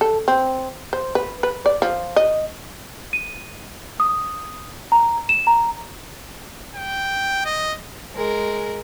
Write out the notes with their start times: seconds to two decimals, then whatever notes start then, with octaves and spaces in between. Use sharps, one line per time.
0.01 A4
0.28 C4
0.93 C5
1.15 B4
1.43 B4
1.66 D5
1.82 F3
2.16 D#5
3.13 D#7
4.00 D#6
4.92 A#5
5.29 E7
5.47 A#5
6.76 G5
7.45 D#5
8.15 G#3 A#4